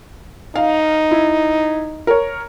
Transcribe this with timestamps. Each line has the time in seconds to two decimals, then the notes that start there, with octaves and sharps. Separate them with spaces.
0.56 D#4 F5
1.11 E4
2.07 A#4 C#5